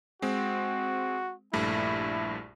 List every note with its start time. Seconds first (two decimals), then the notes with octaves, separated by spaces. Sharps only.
0.22 G#3 C4 F#4
1.53 A#1 G2 A3 E4